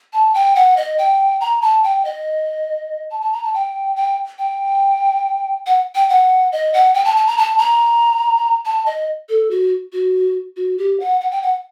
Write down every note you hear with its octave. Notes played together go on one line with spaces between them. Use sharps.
A5
G5
F#5
D#5
G5
A#5
A5
G5
D#5
A5
A5
A#5
A5
G5
G5
G5
F#5
G5
F#5
D#5
F#5
G5
A5
A5
A#5
A5
A#5
A5
D#5
A4
F#4
F#4
F#4
G4
F#5
F#5
G5
F#5